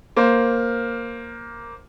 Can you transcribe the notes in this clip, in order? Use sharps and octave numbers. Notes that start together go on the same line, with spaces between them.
A#3 C5